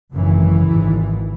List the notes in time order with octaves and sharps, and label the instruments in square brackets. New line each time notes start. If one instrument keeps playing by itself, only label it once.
[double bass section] G#1 F#2 C#3 E3
G#1 G#2